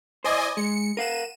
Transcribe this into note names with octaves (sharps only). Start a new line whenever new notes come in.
E4 C5 D5 D#5 G#5
G#3 C#7
A#4 F5 F#5 D#7 E7